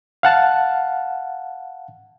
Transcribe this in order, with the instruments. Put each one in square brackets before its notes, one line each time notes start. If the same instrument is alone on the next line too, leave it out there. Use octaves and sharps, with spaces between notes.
[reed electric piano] F5 F#5 A5